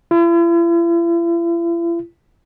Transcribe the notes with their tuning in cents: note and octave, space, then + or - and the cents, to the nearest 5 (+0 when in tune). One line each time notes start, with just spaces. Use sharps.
E4 +45